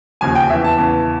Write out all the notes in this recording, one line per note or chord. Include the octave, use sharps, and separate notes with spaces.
D#2 C#3 F3 G#5
G5
E2 C#3 E3 E5
A5
E2 C#3 E3